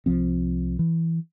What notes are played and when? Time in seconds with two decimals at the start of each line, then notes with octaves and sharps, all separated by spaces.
0.06 C2 F3 C4
0.79 E3